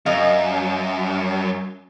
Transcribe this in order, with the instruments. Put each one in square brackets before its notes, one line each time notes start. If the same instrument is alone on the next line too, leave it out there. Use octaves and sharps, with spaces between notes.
[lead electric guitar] F#2 [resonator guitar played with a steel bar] D#5 F5